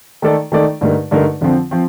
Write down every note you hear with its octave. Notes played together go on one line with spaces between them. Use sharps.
D#3 A3 D#4 A4 D5
D#3 A3 D#4 A4 D5
G2 D3 A3 D#4 A#4
G2 D3 A3 D#4 A#4
F2 D3 F3 C4
F3 C4